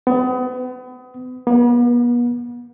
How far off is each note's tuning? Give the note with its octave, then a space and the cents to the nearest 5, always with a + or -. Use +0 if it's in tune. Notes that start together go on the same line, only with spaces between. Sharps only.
B3 +35
B3 -40